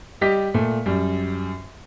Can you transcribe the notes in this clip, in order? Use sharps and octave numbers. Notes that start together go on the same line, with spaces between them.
G3 G4 D#5 B6
A#2 A3
F#2 G3